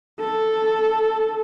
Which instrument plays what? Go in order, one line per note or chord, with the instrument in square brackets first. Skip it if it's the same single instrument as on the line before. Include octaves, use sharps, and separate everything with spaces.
[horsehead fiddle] A4